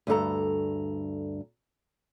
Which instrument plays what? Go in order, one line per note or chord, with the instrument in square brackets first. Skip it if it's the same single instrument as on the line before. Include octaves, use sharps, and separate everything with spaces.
[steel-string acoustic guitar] D2 G2 A4 A#5